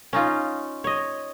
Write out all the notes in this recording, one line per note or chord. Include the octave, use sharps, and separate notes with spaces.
C#4 D#4 F4
C#5 D#5